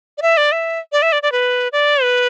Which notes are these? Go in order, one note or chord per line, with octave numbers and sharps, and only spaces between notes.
D5
E5
D5
E5
D5
E5
D5
D5
B4
D5
B4